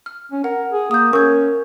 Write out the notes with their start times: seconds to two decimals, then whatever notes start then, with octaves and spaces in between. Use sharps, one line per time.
0.06 F6
0.32 C#4
0.44 A#4 F#5
0.73 G#4
0.91 A#3 D#6 G6
1.13 C#4 A#4 C#6 G6 G#6